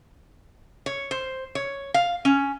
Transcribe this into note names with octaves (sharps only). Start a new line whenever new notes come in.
C#5
C5
C#5
F5
C#4